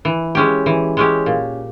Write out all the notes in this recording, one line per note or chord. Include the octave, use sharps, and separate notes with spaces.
E3
G#3 C#4 G4
E3
G#3 C#4 G4
A#2